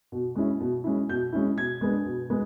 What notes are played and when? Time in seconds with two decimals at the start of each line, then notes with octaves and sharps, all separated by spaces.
0.12 B2
0.35 G#3 C#4 E4
0.60 B2
0.84 G#3 C#4 E4
1.09 B2 G6
1.32 G#3 C#4 E4
1.58 B2 G#6
1.81 G#3 B3 D4
2.05 B2
2.30 G#3 B3